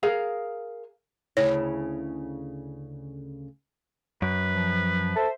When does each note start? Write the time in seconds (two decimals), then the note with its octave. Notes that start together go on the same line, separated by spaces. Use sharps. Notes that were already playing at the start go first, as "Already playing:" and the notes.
0.03 G#4 A#4 F5
1.37 D2 C#3 E4 C#5
4.22 F#2 B4
4.53 F3
5.16 A4 C5 E5